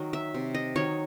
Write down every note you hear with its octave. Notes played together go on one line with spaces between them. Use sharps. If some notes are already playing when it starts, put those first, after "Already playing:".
Already playing: D#3 F#3
E5
C3
D#5
D#3 F#3 C#5